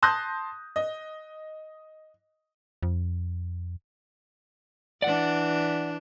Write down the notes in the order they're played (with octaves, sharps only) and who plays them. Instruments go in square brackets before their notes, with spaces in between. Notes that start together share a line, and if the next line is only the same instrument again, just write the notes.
[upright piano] A5 C6 D#6 F#6 G6 A#6
D#5
[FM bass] F2
[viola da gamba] E3 D4 [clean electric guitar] D5 F#5